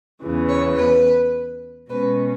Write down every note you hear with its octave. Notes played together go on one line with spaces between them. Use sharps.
E2 C#3 E3
C#5
B4
B2 G#3 C#4 B4